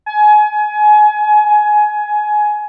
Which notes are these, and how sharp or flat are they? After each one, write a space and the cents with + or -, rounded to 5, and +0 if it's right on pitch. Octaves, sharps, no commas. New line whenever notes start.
G#5 +30
G#5 +20